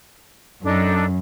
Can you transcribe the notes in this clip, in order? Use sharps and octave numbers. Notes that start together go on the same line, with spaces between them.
F#2 D4 D#4 A4